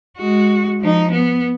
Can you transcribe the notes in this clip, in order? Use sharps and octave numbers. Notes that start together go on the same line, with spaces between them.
G#3 F#4
F3 D#4
B3